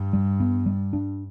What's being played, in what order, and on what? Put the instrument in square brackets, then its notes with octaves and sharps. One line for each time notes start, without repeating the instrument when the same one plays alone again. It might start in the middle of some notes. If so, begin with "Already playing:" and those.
Already playing: [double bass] G2
[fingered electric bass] G3
B3
G3
D4